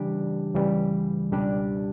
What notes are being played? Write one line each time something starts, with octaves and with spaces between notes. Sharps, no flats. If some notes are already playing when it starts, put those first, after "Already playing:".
Already playing: C#3 E3 G3 D4 G4
C#2 C#3 E3 G3
C#2 B2 G3 D4 G4